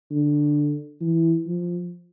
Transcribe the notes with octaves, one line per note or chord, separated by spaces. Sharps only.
D3
E3
F3